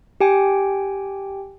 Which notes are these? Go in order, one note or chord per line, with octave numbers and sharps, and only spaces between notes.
G4 G5 G#5